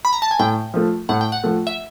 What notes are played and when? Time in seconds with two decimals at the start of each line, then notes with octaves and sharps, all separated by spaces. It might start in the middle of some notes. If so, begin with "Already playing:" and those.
0.05 B5
0.13 A#5
0.22 A5
0.31 G#5
0.39 A2 G5
0.74 F3 A3
1.09 A2 F#5
1.21 G5
1.32 F#5
1.44 F3 A3
1.67 E5